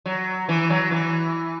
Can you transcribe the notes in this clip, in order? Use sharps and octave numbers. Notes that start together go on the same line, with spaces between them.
F#3
E3
F#3
E3